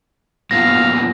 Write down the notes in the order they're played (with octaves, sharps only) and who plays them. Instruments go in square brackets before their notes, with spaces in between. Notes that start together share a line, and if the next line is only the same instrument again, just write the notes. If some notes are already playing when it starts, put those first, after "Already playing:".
[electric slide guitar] F#2 A#2 B3 [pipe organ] F5 [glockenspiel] A#6